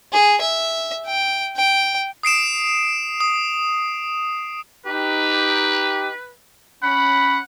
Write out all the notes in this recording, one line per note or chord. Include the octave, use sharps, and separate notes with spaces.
G#4
E5
G5
G5
D#6 C7 D7 E7
D#6
D#4 G4 B4
C#4 F#5 B5